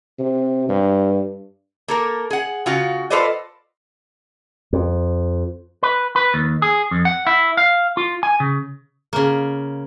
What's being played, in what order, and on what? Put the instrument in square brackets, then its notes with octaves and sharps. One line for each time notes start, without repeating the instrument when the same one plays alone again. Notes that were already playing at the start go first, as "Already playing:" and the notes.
[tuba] C3
G2
[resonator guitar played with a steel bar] A#3 A4 A#4
G#4 F#5
C#3 F4 F#4
F4 A4 B4 C5 D5 D#5
[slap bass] F2
[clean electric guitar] B4
B4
D#2
G#4
F2
F#5
E4
F5
F4
G#5
C#3
[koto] C#3 A#3